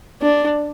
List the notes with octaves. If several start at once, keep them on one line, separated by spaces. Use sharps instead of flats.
D4